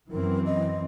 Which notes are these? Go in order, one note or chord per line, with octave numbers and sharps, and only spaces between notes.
F#2 E3 C4 A#4
D#5